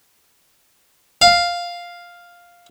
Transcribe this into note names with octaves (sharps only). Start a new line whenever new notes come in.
F5